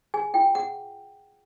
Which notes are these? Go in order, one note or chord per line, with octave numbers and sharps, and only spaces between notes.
G#4 G#5
F4 G5
G#4 F#5